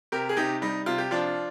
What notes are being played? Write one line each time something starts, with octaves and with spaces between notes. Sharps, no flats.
C3 G4 A#4
G#4
C3 D#4 G4
G3 D#4
C3 F4
G4
F3 D4 F4